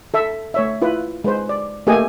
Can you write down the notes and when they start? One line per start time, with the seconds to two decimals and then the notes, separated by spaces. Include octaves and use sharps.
0.14 A4 E5
0.54 A3 C#5 E5
0.82 E4 F4 B4
1.24 G#3 B4 C5
1.49 D5
1.87 A3 A#3 G4 G#4 D#5 G#5